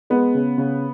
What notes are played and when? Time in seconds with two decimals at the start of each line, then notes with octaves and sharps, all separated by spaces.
0.10 G#3 B3
0.35 C#3
0.58 C#3